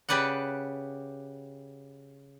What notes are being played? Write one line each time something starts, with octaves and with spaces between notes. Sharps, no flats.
C#3 G4 B4 D5 F#5